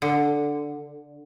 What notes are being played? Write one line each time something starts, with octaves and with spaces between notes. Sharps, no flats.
D3